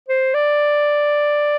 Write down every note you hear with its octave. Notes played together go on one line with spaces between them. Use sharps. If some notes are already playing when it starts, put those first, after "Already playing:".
C5
D5